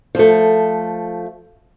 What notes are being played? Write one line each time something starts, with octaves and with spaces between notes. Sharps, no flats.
F3 A3